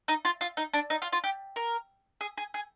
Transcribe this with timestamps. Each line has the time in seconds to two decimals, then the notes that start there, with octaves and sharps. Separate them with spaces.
0.08 D#4
0.25 F4
0.41 F4
0.57 D#4
0.73 D4
0.90 D#4
1.02 F4
1.12 F4
1.24 G4
1.56 A#4
2.21 G#4
2.37 G#4
2.54 G#4